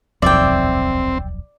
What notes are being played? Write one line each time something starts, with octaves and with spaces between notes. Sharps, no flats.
D#1 B1 F2 C4 D5 E5 G5